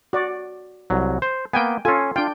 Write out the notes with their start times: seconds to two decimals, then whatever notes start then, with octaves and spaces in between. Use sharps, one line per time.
0.13 F#4 D5
0.90 C2 F#3
1.22 C5
1.53 A#3 B3 G5 G#5
1.85 C#4 F4 A4 G#5
2.16 D4 F4 G5